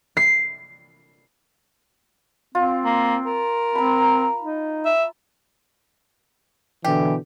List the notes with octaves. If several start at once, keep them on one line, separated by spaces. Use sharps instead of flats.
C7
C4 F4
A#3
A#4
C4 A#5 B5
D#4
E5
B2 D3 E3 G4